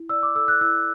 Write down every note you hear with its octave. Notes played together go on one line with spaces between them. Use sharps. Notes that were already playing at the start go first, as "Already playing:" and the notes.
Already playing: E4
D5 E6
D6
A4 E6
F#6
E4 E6